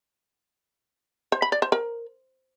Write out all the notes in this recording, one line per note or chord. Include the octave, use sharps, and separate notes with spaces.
C5
B5
D5
C5
A#4